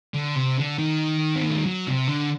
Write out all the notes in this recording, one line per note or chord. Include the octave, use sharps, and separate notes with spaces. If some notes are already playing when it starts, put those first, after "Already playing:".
D3
C3
D3
D#3
C4
A#3
A3
G3
F#3
C3
D3